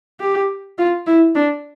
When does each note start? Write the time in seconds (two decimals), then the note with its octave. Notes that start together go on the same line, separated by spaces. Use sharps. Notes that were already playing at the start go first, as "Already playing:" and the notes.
0.20 G4
0.78 F4
1.07 E4
1.35 D4